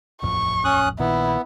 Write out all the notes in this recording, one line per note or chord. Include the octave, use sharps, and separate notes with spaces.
D#1 A1 F2 C#6
C#4 D#6 F#6
A#1 A#2 D#3 B3 E4